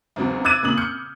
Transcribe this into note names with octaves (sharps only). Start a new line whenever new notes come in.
G#1 E2 C#3 F#3
D6 E6 F#6 G#6 A6 D#7
A#2 C#3 D#6 F#7
F6 G6 C#7